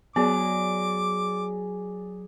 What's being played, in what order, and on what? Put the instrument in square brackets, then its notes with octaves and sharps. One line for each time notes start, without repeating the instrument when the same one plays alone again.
[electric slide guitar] F#3 [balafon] B3 [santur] G#4 D5 [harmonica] D6